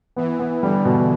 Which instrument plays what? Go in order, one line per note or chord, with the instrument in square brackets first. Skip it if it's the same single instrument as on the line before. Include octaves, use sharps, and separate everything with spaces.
[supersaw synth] E3 [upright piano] B3
[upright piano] B3
[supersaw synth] D3 [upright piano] G3
[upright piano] B2